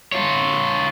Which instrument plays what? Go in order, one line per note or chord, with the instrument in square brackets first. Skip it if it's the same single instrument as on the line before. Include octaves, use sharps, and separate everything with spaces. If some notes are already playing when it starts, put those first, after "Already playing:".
[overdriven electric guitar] F4 C#5